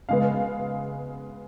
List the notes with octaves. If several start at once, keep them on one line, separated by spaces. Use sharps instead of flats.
C#3 G#3 B3 F5